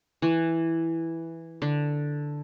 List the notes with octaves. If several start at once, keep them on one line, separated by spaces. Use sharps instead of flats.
E3
D3